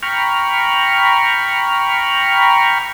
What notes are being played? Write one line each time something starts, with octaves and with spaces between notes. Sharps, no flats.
G5 A#5 B5 C#6 F6